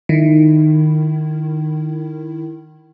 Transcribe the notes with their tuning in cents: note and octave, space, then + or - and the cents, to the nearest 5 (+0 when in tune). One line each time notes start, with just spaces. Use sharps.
D#3 -15 E4 +0